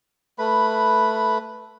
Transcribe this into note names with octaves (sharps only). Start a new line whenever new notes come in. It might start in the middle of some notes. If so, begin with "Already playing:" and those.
A3 B4 B5